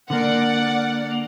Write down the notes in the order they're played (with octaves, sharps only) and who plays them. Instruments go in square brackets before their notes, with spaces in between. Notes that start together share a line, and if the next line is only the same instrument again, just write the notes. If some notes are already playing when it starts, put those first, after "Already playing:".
[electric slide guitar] D3 A#3 [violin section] D5 F#5